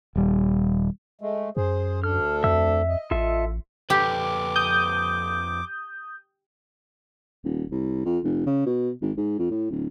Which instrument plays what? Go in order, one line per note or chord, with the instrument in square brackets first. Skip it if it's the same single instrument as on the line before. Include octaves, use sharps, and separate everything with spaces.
[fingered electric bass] D#1 G3
[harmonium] G#3 A3
[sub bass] F#2 [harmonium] G#4 C5
[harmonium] D2 D4 A4 [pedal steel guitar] F6
[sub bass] F2 [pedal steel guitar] E5 E6
[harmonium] D#5
[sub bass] A1 [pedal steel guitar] F4 A4 E5
[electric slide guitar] F2 A4 B4 [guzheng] G4 [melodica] D6
[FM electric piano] D#6 G6
[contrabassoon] D#1
C2
F2
F1
C#3
B2
G#1
G#2
F2
A2
D1